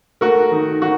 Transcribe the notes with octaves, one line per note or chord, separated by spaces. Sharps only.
A3 F#4 A#4
D#3
D#3 F#4